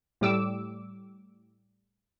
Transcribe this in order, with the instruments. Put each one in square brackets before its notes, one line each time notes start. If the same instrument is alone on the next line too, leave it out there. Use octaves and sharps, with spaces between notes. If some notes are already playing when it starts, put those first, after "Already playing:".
[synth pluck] A2 G3 D6 E6